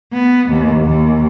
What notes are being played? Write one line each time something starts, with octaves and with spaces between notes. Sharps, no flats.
B3
D#2
D#2